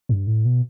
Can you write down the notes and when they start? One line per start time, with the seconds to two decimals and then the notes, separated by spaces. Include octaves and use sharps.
0.09 G2
0.27 A2
0.45 B2